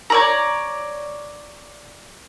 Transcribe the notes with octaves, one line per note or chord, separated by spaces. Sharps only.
C#5 D5 A#5